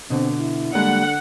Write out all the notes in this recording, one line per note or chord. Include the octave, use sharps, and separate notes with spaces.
B2 D3 C4
E4
D3 G3 G#3 A#3 F#5